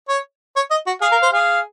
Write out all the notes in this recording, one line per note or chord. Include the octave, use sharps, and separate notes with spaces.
C#5
C#5
D#5
F#4
G#4 F5
A#4
C5
G#4 F5